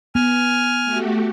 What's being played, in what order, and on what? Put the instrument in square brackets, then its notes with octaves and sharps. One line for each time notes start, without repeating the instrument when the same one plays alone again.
[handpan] B3 [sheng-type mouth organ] G#5 F6
[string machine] A3 F#4 G4